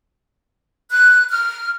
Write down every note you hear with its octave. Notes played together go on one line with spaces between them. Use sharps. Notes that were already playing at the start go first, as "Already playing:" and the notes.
F#6
F6